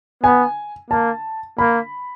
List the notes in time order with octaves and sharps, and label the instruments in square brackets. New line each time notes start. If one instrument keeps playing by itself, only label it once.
[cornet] B3 [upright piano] G#5
[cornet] A#3 [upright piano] A5
[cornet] A#3 [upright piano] B5